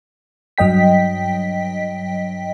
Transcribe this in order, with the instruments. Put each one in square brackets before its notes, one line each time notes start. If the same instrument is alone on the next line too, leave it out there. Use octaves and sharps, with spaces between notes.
[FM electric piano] G2 F#3 D#5 G5 B6